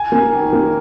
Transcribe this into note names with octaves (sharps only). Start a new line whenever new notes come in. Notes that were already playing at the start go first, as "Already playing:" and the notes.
Already playing: G#5
A#3
D#3
A#3